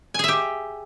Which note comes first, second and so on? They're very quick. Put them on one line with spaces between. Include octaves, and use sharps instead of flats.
G#5 G#4 E5 G4